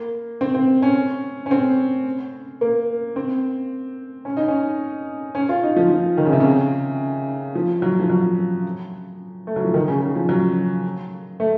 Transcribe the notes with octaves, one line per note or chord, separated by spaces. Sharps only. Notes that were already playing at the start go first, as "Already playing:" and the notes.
Already playing: A#3
C4
C4
C#4
C#4
C4
A#3
C4
C#4
D#4
C#4
C#4
F4
D#4
F3
F3
D#3
C#3
C3
C#3
F3
F#3
F3
F#3
A3
F#3
F3
D#3
C#3
C#3
F3
F#3
A3